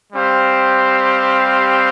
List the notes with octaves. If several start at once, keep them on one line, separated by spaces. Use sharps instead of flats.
G3 C4 G4 C5 F5